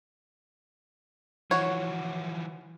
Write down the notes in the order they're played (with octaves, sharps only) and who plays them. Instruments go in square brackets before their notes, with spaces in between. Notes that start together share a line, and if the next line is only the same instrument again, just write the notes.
[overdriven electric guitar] E3 F3 [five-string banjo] F#4 C#5